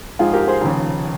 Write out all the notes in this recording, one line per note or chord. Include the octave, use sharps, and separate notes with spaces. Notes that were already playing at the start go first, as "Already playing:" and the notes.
A#1 G#2 F3 F4 G#4
G4 A#4
G#4 C5
F1 D#2 C#3